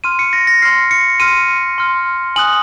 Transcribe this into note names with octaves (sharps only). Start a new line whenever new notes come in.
C6 F6 D#7
C#7
A#6
A#6
C6 F6 C7
C#7
C6 F6 D#7
C6 F6
G#5 D#6 F#6 F#7